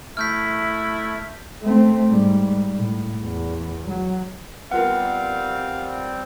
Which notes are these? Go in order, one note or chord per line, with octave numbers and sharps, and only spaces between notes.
A3 E4 F6 G6 B6
A3 C4
G#2 G3
A2
E2
F#3
G3 B3 C4 F4 A#4 F5 F#5